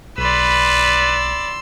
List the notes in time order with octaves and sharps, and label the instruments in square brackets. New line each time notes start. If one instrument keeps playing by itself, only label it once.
[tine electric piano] B1 [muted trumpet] B4 [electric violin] D5 B5 [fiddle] C6 E6